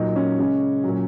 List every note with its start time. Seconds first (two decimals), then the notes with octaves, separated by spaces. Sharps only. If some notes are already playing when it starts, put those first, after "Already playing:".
Already playing: A#2 F#3 D#4
0.16 C#4
0.39 C#3 G#3
0.84 A#2 F#3